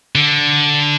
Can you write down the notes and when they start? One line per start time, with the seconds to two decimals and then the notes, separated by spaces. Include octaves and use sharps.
0.15 D3